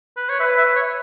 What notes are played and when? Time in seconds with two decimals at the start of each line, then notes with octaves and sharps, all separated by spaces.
0.17 B4
0.29 C#5
0.40 B4 E5
0.58 E5
0.76 C#5